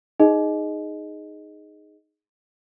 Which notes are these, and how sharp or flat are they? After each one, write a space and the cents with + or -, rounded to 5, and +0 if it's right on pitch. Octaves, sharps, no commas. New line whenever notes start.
D#4 +0 G#4 +0 D#5 +0